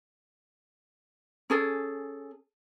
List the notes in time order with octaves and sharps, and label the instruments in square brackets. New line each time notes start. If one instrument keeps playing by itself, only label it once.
[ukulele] C#4 G#4 A4